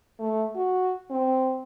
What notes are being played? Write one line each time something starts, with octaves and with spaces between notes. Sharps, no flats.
A3
F#4
C4